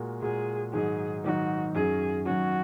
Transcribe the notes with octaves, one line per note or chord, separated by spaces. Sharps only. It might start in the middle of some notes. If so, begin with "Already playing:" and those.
Already playing: A#2 G#3 F#4 A#4
A#2 G#3 F#4 G#4 A#4
G#2 D#3 F#3 D#4 G#4
G#2 D#3 F#3 D#4 F#4
F#2 D#3 F#3 C#4 G#4
F#2 D#3 F#3 C#4 F#4